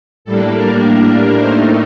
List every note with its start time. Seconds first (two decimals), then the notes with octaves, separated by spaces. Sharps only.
0.25 A2 G3 A#3 D4 A4
0.53 A#4
1.39 A2 A3 D#4 C5